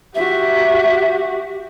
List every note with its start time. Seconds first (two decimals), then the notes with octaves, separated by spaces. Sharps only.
0.15 F#4 G4 E5